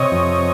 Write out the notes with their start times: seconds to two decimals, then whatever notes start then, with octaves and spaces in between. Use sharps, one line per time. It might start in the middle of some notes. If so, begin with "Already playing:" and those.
Already playing: C3 C#5 D#5
0.11 F2